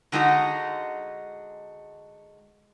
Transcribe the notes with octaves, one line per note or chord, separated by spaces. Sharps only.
D3 G#3 D#4 F#4